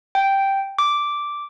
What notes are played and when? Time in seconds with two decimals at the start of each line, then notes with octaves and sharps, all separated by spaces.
0.15 G5
0.79 D6